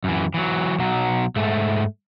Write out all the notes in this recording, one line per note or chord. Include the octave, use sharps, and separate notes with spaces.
F#2 E3
E3 F#3
B1 F#3
G#2 A3